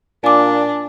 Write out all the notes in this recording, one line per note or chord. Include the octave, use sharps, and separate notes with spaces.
A#2 D4 G#5 D6